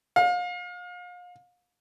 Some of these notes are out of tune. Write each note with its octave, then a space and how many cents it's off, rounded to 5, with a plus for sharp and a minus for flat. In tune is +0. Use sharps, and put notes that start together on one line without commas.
F5 +35